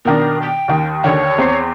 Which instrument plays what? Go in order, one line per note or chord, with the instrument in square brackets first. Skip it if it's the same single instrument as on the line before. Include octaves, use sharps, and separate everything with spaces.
[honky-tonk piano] B2 D#3 D4 [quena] A#4
[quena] G5
[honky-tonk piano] D#2 D#3
[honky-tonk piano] D#2 D3 D#3 [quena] C#5
[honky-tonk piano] E2 C4 C7